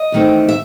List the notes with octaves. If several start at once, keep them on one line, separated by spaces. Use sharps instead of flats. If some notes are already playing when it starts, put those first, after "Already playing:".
Already playing: D#5
E2 D#3 A3 C4
E5